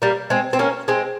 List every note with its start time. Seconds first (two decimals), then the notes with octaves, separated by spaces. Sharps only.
0.02 G3 A#3
0.30 G#3 C4
0.53 C4
0.59 A#3 C#4
0.88 G#3 C4